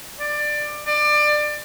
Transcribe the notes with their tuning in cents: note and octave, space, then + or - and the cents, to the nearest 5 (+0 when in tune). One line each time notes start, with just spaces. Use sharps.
D5 +15
D5 +25